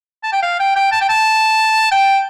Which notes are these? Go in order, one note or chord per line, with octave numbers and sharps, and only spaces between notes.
A5
G5
F5
G5
G5
A5
G5
A5
G5